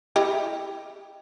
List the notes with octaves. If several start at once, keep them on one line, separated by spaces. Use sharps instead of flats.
E4 G4 D#5